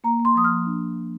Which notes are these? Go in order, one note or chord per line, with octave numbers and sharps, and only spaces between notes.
A#3 A#5
A#3
C6
F3 D#6
F6
F3
D4